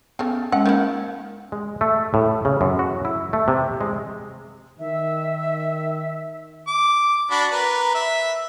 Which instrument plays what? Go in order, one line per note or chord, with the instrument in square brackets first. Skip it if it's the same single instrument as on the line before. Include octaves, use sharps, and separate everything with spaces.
[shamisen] C#3 A3 [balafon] B3
[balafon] G#3 C#4 G5 [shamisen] F#5
[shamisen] D#3 F3 E4 [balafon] A#3
[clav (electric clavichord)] G#3
A3
A2
C#3
F#2
F#4
E4
A3
C3
G#3
[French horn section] D#3 [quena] E5
[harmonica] D6
D4 F#4 B5
A#4 B4
E5